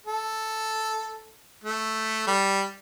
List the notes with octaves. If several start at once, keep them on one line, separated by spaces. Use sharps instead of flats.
A4
A3
G3